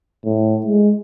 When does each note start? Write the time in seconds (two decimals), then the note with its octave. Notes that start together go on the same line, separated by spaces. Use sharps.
0.25 A2
0.66 G#3